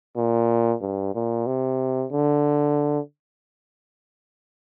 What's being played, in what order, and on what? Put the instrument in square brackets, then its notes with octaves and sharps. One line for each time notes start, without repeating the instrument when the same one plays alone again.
[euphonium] A#2
G2
A#2
C3
D3